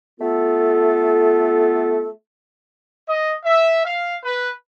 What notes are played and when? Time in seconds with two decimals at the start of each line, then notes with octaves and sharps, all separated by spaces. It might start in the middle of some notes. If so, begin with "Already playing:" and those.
0.19 A3 B3 F4 A4
3.07 D#5
3.45 E5
3.85 F5
4.23 B4